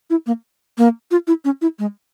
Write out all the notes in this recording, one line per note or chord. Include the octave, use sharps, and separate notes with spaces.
E4
A#3
A#3
F4
E4
C#4
E4
G#3